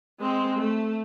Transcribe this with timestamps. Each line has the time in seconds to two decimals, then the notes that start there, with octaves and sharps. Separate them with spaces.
0.20 G#3 C4
0.58 A3